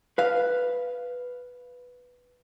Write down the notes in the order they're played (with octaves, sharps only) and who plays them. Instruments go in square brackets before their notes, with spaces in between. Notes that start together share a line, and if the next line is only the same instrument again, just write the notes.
[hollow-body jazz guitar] B4 F5